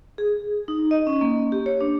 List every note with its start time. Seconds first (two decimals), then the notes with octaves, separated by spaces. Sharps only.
0.18 G#4
0.68 D#4
0.91 D#5
1.07 C#4
1.21 A#3
1.52 G4
1.66 C#5
1.81 D4